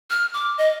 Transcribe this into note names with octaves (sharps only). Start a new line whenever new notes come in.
F6
D6
D#5